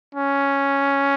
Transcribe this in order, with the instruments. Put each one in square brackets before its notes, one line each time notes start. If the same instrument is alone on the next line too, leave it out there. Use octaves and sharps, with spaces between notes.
[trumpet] C#4